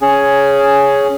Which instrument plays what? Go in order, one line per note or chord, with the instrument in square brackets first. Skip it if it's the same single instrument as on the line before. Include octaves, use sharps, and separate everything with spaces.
[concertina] C#4 G#4